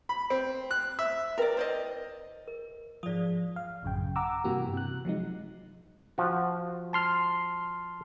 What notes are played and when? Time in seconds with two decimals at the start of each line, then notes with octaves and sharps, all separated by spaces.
0.09 B5
0.30 C4
0.71 F#6
0.99 E5
1.38 E4 A#4 B4 D5 G5
1.57 C5 D5 D#5
2.48 A#4
3.03 G#2 F3 D5 D#6
3.56 F5
3.83 A1 F#2 C#3 G5
4.16 F#5 A#5 D6 E6
4.44 G2 C3 E3 A#3 F#4 G4
4.73 C3 F#6
5.05 F3 F#3 G#3 D#4
6.18 F3 F#4
6.93 A5 C6 F6